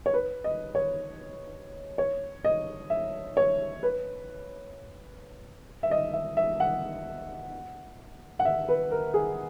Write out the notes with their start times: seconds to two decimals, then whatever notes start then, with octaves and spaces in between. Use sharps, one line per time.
0.06 C#5
0.14 B4
0.44 D#5
0.75 C#5
1.98 C#5
2.44 D#5
2.90 E5
3.37 C#5
3.83 B4
5.83 E5
5.91 D#5
6.13 E5
6.37 E5
6.60 F#5
8.39 F#5
8.45 E5
8.69 B4
8.91 A#4
9.14 G#4